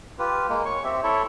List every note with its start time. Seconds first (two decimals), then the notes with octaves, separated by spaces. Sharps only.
0.19 F4 G4 B4
0.49 G#3 A#3
0.65 C#5 C#6
0.84 C4 G4 E5
1.03 E4 A4 C#5 E5